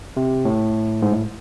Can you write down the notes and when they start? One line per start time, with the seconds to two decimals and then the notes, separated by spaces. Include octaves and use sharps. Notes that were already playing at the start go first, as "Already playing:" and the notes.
0.17 C3
0.45 A2
1.02 G#2
1.12 A2